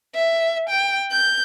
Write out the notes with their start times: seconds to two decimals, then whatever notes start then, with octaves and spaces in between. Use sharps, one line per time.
0.15 E5
0.69 G5
1.11 G6